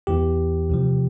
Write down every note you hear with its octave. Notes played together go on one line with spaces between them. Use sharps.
E2 E3 G4
D2 C3 F3